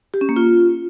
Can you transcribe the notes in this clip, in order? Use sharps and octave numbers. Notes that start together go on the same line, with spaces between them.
G4
C#4
A#3
F4